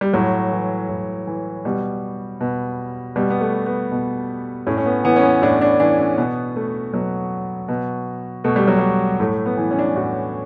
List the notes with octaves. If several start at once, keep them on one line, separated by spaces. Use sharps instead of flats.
G3
A2 F#3
E3
A2
E3
B2 G3
B2
B2 G3
B3
A3
B3
B2
A2 C#4
C#4
B3
E3 B3
C#4
B3
A2 D4
D4
E3 D4
C#4
B2 B3
A3
B2 F#3
B2
B2 A3
G3
F#3
G3
A2 A3
B3
E3
C#4
D4
C#4
A2 F#4